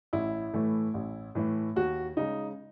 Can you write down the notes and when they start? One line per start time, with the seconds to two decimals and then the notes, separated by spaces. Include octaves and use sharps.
0.13 A1 E4
0.53 A2 E3 A3
0.94 A1
1.35 A2 E3 A3
1.76 D#2 F#4
2.17 C#3 G#3 D#4